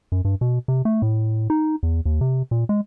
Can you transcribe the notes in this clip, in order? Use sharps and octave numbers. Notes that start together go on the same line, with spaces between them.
F#2
G2
B2
C3
A3
A2
D#4
E2
D#2
C3
A#2
G#3